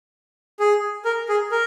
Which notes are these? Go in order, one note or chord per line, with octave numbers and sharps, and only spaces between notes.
G#4
A#4
G#4
A#4